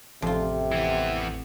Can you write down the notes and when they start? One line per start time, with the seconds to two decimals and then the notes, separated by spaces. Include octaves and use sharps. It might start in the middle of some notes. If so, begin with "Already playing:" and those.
0.22 A1 F2 C3 F4
0.72 E3 B3